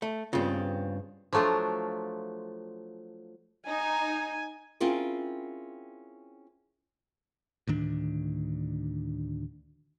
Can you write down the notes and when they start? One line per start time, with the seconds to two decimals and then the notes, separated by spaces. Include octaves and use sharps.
0.02 A3
0.33 G2 C#3 B3 C4 F4
1.33 F3 F#3 A3 D4 F4
3.67 D#4 G#5
4.80 C4 C#4 E4 F4 G#4 A#4
7.67 D2 A2 D#3 D4